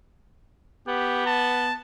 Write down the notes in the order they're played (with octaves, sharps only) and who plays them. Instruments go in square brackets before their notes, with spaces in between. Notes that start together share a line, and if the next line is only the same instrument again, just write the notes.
[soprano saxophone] B3 [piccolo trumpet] G4
[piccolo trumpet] A5